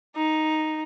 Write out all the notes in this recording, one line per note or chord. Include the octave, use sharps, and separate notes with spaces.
D#4